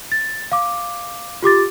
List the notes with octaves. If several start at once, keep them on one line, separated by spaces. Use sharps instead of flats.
A6
F5 D6
F4 G4 D6 A6